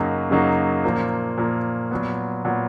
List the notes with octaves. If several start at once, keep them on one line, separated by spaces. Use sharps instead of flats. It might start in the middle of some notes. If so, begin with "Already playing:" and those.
Already playing: F#2 C#3 F#3 A#3 D#4
F#2 C#3 F#3 A#3 D#4
A#2 F3 A#3
A#2 F3 A#3
A#2 F#3 B3
A#2 F#3 B3